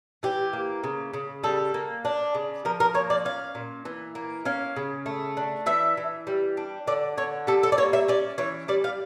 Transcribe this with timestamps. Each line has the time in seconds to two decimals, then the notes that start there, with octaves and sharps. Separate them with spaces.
0.23 E3 G4
0.53 A#3
0.84 C#3
1.14 C#3
1.43 G3 A4
1.74 A#3
2.05 D4
2.35 C#3
2.65 F3 A#4
2.80 A#4
2.94 A#3 C#5
3.10 D5
3.25 C#4 F5
3.55 A#2
3.85 E3
4.15 A#3
4.45 C#4 F5
4.76 C#3
5.06 A3
5.37 D4
5.66 E3 E5
5.97 E3
6.27 G3
6.57 D4
6.87 D3 D5
7.18 D3 C#5
7.47 G3 A4
7.63 A4
7.72 D5
7.78 A#3 C#5
7.93 E5
8.08 C#4 D5
8.38 E3 C#5
8.68 G3 D5
8.84 F5